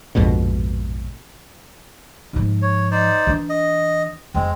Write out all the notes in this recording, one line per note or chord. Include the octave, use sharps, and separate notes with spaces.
A#1 F2 G#2 B2
G#2 F3
C#5
D#4 C5 D5
E3 D4
D#5
F2 G#3 C4